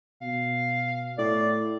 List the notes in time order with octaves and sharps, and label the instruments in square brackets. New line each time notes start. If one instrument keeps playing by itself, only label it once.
[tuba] B2 [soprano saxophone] F5
[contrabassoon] A2 [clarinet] D5